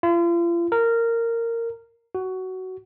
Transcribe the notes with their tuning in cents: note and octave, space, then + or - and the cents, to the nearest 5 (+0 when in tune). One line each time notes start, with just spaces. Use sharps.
F4 -40
A#4 -15
F#4 +15